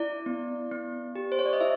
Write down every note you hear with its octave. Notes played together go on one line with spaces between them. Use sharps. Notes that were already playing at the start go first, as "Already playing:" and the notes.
Already playing: E4 D5
B3
B3
G4
C5
C#5
D5
D#5
E4 E5